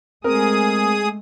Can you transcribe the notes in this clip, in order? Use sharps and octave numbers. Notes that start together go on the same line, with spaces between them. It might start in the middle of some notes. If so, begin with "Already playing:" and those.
G#3 A3 C4 G#4 A#4 D#6